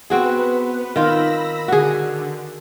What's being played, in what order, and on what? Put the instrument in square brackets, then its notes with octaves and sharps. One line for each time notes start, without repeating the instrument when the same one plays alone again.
[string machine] B3 B4 [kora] C4 F#4 G#4
[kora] D#3 F4 [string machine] B5 E6 A#6
[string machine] D3 [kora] F#4 G#4